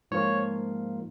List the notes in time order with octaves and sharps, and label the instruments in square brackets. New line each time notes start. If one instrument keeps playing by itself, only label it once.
[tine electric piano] G#2 F3 A#3 F4 C#5